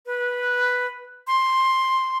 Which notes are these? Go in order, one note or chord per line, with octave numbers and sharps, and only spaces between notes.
B4
C6